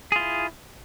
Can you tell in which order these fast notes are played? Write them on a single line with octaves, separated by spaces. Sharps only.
G#4 F4 E4